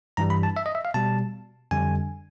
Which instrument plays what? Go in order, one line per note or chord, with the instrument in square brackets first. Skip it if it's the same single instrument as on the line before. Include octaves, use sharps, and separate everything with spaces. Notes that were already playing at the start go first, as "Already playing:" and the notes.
[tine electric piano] G2 E3 G3 A#5
B5
A5
E5
D#5
E5
F5
B2 G3 A5
F2 D3 G3 G#5